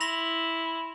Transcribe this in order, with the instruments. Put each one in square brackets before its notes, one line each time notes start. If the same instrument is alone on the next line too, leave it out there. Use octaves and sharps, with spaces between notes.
[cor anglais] E4 [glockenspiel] C6 A#6 F7